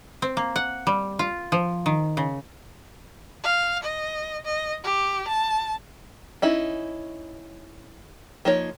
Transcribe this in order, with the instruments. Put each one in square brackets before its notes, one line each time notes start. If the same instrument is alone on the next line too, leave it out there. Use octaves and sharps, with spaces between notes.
[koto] C4
A#3
F#5
G3
F4
F3
D#3
C#3
[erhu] F5
D#5
D#5
G4
A5
[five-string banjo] C#4 D#4 E4
F3 A#3 D#4 C#5